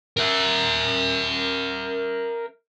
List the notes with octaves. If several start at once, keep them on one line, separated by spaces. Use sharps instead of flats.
A#4 E5